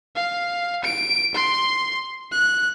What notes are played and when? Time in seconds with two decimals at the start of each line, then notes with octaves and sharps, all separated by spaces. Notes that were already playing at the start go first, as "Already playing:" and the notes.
0.16 F5
0.84 D7
1.35 C6
2.32 F#6